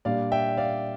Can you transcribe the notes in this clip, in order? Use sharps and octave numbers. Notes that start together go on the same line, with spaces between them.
A#2 G3 D4 D5 F5
E5 G5
D5 F5